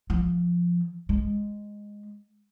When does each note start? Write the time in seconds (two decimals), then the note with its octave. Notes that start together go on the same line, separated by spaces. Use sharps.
0.10 F3
1.09 G#3